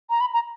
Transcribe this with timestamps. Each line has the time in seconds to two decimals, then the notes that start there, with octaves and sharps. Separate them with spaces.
0.10 A#5
0.21 B5
0.33 A#5